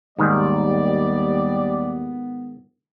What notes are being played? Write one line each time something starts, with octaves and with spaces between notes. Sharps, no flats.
D#2 G#2 D#3 G3 B3 D5